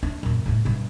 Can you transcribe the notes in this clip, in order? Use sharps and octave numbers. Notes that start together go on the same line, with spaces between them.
D4
F#2 A#2
A2 G#3
G2 B2